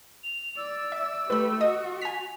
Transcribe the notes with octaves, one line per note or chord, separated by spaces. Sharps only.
F7
D5 E6
E5
A3 G4 B4 B5
F#4 D#5 D#6
G#5 B6 F7